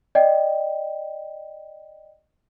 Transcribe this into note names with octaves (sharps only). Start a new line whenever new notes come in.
D5 D#5 G5